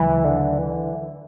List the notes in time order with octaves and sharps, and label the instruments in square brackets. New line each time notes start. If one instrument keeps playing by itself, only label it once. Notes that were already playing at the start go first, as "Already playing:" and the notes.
Already playing: [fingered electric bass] D2 C#3 F#3 [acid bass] E3
[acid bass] D3
E3